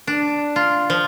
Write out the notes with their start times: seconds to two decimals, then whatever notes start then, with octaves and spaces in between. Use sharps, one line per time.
0.07 D4
0.56 F4
0.90 F3